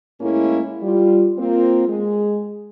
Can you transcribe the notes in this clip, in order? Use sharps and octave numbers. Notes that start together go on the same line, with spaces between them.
A2 G#3 A#3 C#4 E4
G3 F4
A#3 C4 F4
G#3 G#4